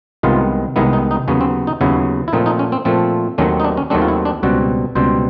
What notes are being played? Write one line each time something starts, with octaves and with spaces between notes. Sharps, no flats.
C2 C3 D#3 G#3 B3 F4
C2 C3 D#3 G#3 B3 E4
D#4
D#4
D#2 C#3 F#3 B3 C#4
C4
D#4
D#2 C#3 F#3 B3 E4
E4
A#2 F3 A3 C4 D#4
D#4
C#4
C4
A#2 F3 A3 C4
D#2 D#3 F#3 A3 C4 C#4
D#4
D4
C#4
D#2 D#3 F#3 A3 C4 D4
F4
E4
D4
C#2 B2 G3 C4 F#4
C#2 B2 G3 C4 C5